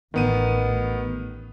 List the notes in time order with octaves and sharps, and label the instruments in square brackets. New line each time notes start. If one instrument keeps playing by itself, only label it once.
[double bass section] A1 [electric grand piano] D#3 B3 D#7